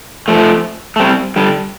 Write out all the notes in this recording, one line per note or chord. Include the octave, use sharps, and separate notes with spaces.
F3 A3
A3
G3 C4
D3 G3